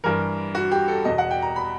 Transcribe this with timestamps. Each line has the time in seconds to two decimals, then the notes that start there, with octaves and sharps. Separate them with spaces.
0.04 G2 E3 A#4
0.55 F#4
0.71 G4
0.88 A4
1.05 E2 B2 D#5
1.18 F#5
1.31 G5
1.42 A#5
1.56 B5